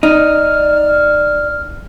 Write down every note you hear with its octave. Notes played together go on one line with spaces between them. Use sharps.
D#4 D5 F6